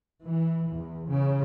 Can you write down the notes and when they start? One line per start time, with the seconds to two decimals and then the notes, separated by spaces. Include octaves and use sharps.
0.24 E3
0.71 E2
1.08 C#3